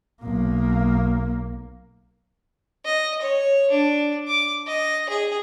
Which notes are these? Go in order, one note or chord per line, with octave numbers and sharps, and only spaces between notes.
B1 A#3
D#5
C#5
D4
D6
D#5
G#4